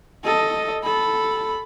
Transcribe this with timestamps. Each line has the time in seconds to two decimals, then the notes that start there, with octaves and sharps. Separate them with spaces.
0.24 A4 D#5
0.83 A4 B5